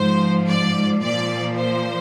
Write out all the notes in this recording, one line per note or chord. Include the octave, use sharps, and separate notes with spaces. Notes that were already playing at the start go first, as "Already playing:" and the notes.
Already playing: G#2 F3 C5
D5
A#2 F3 D5
C5